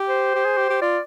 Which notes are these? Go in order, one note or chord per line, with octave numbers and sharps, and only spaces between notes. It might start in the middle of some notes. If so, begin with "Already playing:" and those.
Already playing: G4
C5
G4
G#4
G4
G4
F4 D5